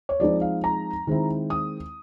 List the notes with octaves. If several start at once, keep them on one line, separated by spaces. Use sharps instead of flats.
C#5
F3 G#3 C4 D#4 D5
F5
A#5
D#3 G#3 C4 E4
D#6